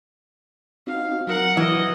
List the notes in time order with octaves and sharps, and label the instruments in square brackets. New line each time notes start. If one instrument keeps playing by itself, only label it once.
[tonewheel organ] C4 D#4 F#4 [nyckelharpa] F5
[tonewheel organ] F#3 [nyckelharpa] A#4 F#5
[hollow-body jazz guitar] E3 [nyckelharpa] D#5